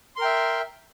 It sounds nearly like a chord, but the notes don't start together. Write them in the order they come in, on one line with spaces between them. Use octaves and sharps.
C6 A#4 G5 E5